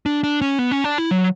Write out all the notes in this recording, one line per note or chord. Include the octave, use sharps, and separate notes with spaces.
D4
D4
C#4
B3
C#4
D4
E4
F#3